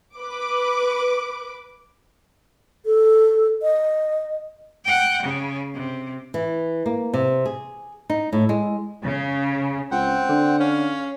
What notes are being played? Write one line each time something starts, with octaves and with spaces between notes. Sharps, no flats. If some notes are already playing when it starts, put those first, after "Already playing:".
B4 D6
A4
D#5
F#5 G5
C#3
C3
E3
A#3
C3
G#4
D#4
A2
G#3
C#3
C#2 C4 F#5 G5
D3
C#4 F5